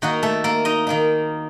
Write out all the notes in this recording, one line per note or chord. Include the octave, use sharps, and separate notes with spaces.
D#3 A#3 D#4 F#4
A3 A4
A#3 A#4
D#4 D#5
D#3 A#3 D#4